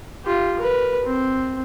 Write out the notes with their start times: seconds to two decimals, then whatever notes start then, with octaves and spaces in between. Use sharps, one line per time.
0.25 F4 G4
0.59 A#4 B4
1.05 C4